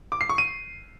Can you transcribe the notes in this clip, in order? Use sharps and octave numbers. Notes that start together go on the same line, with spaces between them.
D6
C7
C#6
D#7